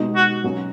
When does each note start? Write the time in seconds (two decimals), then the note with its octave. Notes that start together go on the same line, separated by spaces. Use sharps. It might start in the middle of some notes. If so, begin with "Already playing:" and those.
Already playing: B2 G#3 D#4
0.16 F#4
0.44 B2 F#3 C#4